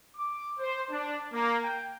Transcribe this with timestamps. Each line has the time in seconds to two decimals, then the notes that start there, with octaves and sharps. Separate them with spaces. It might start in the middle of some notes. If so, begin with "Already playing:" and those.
0.17 D6
0.59 C5
0.90 D4
1.33 A#3
1.64 G5